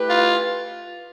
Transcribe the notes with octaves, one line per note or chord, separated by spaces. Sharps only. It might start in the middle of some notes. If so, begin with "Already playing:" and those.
Already playing: A3 E4 G4 B4
F4